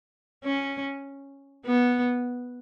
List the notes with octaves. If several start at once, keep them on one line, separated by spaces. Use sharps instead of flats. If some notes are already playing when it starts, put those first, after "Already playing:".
C#4
B3